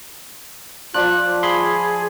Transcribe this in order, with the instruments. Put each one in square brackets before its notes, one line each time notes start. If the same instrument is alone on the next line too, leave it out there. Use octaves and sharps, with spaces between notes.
[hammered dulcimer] F3 D5 [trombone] F4 [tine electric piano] F#6
[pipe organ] G#4 [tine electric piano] B5 C6